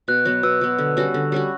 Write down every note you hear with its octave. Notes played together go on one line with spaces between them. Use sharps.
B2 F#6
F#3 B3
B2 E6
F#3 B3
D3
G3 C#4 F#4
D3
G3 C#4 F#4